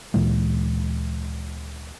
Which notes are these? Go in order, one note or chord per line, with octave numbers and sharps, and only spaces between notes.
D2 A#2 E3 G#3